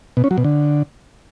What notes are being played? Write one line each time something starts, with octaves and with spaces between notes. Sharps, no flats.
B2
C#4
F#3
B2
D3